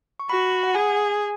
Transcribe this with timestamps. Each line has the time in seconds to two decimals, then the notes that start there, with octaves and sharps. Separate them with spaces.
0.20 C#6
0.30 F#4 B5
0.63 F#5
0.75 G#4 G#5